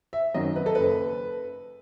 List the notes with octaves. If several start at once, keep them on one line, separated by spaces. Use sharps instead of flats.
E5
F#2 D#3 F#3 D#5
B4
A4
F#1 B4